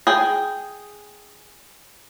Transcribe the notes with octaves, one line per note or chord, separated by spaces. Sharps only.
G#4 G5